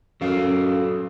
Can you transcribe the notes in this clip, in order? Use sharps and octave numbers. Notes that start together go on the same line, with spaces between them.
F#2 F#3 A4 F5
F#2